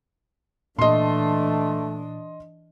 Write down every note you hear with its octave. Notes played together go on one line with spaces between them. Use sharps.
A#2 E3 A3 D4 D#5 C6